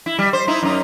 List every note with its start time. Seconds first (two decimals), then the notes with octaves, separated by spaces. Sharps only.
0.06 E4
0.19 G3
0.33 C5
0.48 D#4 E4
0.63 F#2 D#4